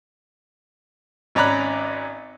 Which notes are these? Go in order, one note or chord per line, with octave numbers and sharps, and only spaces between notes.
G#1 C#4 D5 A#5 B5 F#6